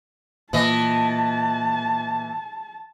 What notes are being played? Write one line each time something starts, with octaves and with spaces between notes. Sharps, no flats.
A#2 E3 D#5 A5